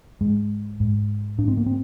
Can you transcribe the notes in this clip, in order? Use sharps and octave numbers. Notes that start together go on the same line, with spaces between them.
G#2 G#3
G#2
G#2 D4
C4
A#3
C4